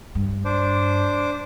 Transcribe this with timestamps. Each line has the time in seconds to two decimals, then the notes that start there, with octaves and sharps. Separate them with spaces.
0.15 G2
0.45 D4 C5 D6